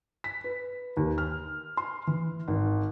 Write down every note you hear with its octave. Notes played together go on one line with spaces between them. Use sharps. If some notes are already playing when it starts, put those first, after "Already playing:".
B6
B4
D#2
F6
C6
E3
G#1